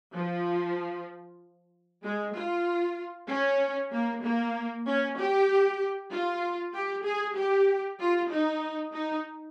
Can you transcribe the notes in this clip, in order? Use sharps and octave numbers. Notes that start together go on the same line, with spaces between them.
F3
G#3
F4
C#4
A#3
A#3
C#4
G4
F4
G4
G#4
G4
F4
D#4
D#4